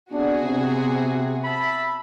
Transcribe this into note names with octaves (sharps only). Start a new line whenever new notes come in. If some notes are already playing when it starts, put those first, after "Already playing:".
C3 B3 D4 F#4 G#4
C3
E5 A5 B5